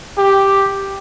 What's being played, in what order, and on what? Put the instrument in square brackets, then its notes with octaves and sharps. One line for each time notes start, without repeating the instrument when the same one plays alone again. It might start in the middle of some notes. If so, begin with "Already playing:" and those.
[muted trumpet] G4